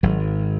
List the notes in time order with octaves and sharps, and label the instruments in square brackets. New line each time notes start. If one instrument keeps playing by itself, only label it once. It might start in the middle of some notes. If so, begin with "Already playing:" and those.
[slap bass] G#1 F#3